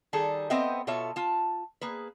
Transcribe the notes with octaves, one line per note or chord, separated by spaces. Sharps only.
D#3 G3 G#4 A4
B3 C4 C5 D#5 E5 G5
B2 F4 A4 C#5 E5
F4 A5
A#3 G#4 B4